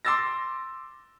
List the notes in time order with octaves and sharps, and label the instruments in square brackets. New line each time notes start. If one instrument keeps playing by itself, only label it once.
[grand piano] C6 D6 E6 A6 A#6